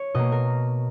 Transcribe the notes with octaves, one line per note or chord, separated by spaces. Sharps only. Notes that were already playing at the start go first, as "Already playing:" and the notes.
Already playing: C#5
B2 A#3 D#5
A#4